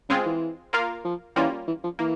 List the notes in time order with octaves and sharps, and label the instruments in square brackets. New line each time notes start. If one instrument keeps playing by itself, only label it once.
[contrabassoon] C#3 [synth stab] G#3 C4 F4 G#4
[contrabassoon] E3
[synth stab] A#3 F4 A#4 F5
[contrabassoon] F3
[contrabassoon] E3 [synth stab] G3 A#3 C#4 F4
[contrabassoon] E3
F3
[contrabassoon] E3 [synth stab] A#3